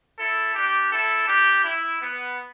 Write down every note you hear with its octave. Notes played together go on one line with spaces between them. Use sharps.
E4 A4
D4 G4
E4 A4
D4 G4
E4
B3